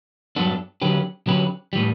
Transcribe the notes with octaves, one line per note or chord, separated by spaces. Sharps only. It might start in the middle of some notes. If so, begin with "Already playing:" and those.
G2 F#3 B3 D4 A4
D3 F#3 C#4 G4 B4
D3 F#3 C#4 G4 B4
A2 E3 G3